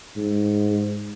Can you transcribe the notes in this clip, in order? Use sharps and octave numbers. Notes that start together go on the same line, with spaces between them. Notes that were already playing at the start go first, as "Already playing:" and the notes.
G#2